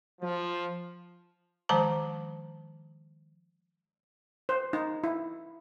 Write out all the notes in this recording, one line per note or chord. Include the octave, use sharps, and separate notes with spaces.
F3
D#3 F3 G#3 C5 A5 A#5
C5
D#4
E4